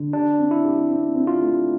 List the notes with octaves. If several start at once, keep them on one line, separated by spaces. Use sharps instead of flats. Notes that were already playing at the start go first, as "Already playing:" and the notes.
Already playing: D3
D4 G4
C4
E4
G4
C4
C4
F4
A3